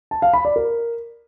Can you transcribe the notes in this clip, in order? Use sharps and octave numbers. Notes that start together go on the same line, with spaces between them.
A5
F5
B5
D5
A#4